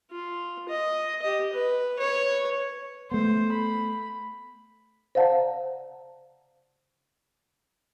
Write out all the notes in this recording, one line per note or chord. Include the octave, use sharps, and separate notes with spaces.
F4
D#5
G4 D#5
B4
B4 C#5
A3 B3 C5
B5
C5 D5 F5 F#5 A5 A#5